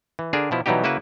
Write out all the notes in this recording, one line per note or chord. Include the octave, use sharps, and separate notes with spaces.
E3
D3 D4 G#4 A#4
B2 F3 E4
B2 E3 F#3 G3 D#4 G4
C#3 A#3 E4 F#4 B4